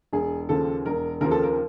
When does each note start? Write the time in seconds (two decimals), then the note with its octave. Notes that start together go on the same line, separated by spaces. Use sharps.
0.13 E1 G#4
0.49 D#2 C#3 F3 A4
0.86 E1 A#4
1.21 D#2 C#3 F3 A#4
1.31 A4
1.43 A#4